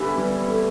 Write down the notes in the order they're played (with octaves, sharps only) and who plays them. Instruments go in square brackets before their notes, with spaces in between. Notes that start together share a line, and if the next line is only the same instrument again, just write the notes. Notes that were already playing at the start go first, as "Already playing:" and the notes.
Already playing: [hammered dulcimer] G2 E3 B3 E4 [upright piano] D3
[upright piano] G3
A3